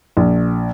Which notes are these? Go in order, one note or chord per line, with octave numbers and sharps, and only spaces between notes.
A#1